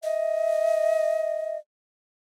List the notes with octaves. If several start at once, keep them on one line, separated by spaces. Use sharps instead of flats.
D#5 E5